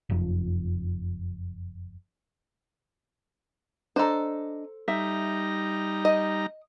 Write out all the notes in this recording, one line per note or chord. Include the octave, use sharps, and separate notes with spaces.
F#1 F2
D4 A4 C5 D#5 A#5
G3 D#4 E5 A#5
D#5